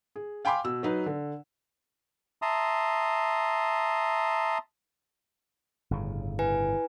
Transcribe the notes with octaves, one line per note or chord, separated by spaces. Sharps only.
G#4
F5 G5 G#5 B5 C6 D6
B2 E6
F#3 D#4 B4
D3
E5 A5 A#5 C6 D#6
G1 A2 C#3
E4 B4 G#5